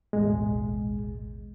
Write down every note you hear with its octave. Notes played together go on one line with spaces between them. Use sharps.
A1 D#2 B2 G#3